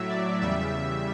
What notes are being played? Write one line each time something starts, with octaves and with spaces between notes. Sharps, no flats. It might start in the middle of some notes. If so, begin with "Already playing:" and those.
Already playing: A2 F#3 E5
D5
E2 C#3 G3 E5